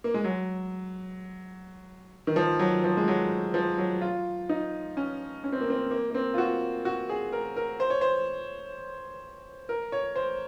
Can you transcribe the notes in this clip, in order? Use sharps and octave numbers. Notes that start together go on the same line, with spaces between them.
A#3
G#3
F#3
D#3
F3
F#3
F3
G#3
F#3
F3
F#3
F4
D#4
C#4
C#4
C4
A#3
C4
A#3
A#3
C4
F4
F#4
F#4
G#4
A#4
A#4
C5
C#5
C5
A#4
C#5
C5